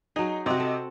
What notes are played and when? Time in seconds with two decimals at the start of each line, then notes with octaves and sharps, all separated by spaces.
0.16 F#3 D#4 G#4
0.46 C3 C4 F#4 D#5
0.60 A4